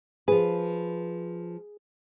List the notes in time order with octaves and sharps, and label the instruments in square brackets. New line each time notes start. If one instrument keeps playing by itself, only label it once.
[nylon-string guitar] F3 B4 [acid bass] G#4